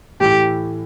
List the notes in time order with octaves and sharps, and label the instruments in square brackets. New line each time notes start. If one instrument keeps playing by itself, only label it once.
[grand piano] A2 E3 A3 E4 [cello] G4